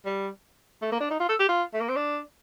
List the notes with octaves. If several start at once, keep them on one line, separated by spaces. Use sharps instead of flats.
G3
A3
A#3
D4
D#4
F4
A4
G4
F4
A3
A#3
C4
D4